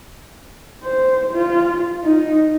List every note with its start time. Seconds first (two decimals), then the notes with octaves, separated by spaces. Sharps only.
0.84 C5
1.34 F4
2.05 D#4